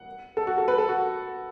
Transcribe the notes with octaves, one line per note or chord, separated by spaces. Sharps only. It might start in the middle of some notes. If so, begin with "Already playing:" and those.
Already playing: F#5
A4
F#4
A4
B4
A4
F#4